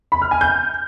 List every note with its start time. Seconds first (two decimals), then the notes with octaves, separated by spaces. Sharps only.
0.12 B5
0.22 F6
0.31 G#5
0.41 G6